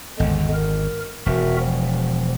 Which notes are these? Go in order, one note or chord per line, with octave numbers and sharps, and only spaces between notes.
G#1 E2 D3 G#3
A#4
E1 F#4 A#4 E5
F3